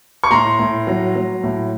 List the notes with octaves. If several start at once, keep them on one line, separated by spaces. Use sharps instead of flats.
C#6
A2 A#5 C6
A2
F#3
F#3
A2